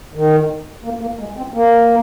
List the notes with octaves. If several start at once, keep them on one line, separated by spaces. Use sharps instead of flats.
D#3
A#3
A#3
G#3
C4
A#3